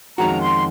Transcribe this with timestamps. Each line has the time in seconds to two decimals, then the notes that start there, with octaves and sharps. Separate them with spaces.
0.18 F2 D#3 G#3 C#4 F#4 A#5
0.40 C6